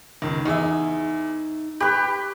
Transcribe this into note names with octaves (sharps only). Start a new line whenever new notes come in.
C#2 D#3
E2 D#4 G#4 E5
G4 B4 B5 C#6